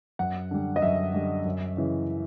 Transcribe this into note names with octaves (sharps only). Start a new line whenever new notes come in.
F#2 F#5
D3 G3
D#5
F#2 E5
D3 G3
F#2
C#3 E3